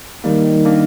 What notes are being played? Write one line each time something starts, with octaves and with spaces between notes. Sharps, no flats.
D#3 G3 A#3
A#3 D4